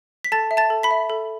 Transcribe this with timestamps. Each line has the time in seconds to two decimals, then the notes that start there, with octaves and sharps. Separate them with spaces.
0.24 B6
0.32 A4 A5 A6
0.51 E5
0.57 A5 A6
0.70 A4
0.83 B5 B6
0.91 E5
1.10 A4